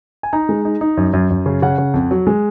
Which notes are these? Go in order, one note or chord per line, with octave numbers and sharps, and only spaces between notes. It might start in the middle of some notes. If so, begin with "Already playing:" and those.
G#5
D#4 A#5
G#3
D#4
D#4
F#2
F#2
F#2
C#3
C#3 F#5
C#3
F2
F#3
G#3